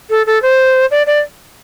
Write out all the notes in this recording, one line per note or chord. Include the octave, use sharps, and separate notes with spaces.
A4
A4
C5
D5
D5